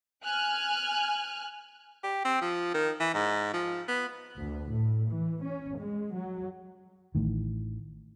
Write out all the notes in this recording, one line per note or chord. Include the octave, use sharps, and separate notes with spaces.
G#5 F6 F#6
G4
C4
F3
D#3
E3
G#2
F3
B3
D2
A2
E3
C#4
G#3
F#3
A1 A2 D#3